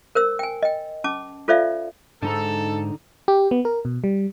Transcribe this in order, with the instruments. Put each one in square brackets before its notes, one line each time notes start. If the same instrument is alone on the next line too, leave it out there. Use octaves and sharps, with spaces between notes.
[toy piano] A#4 C5 E6
G5 G#5
D#5 G5
C#4 A5 D6
F4 A4 C5 D5 E5 F5
[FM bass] G#2 [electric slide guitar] D3 D#4 A#5 [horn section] A4
[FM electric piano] G4
B3
A#4
B2
G3